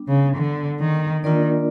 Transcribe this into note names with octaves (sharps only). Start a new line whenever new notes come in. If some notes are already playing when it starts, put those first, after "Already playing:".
Already playing: G3 B3 D4
C#3
D3
D#3
D#3 A#3 D4 F4 A#4 D5